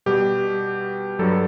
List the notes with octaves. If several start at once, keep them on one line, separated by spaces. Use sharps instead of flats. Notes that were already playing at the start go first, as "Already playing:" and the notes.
B2 G3 G4
G2 F#3 A4